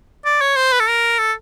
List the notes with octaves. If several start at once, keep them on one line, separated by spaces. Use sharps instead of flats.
D5
C#5
C5
B4
A4
A#4
A4